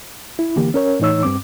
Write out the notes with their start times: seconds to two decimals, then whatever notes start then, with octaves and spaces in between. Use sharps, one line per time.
0.39 E4
0.56 D3 E3 A#3 G4
0.74 C#4 A#4 C#5
1.00 A2 E3 D#4 C#5 E6
1.23 G2 C4 D6